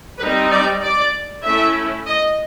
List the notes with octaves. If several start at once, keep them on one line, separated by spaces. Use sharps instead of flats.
G3 C4 D#4 B4
D5
D5
A3 C#4 E4 E5
D#5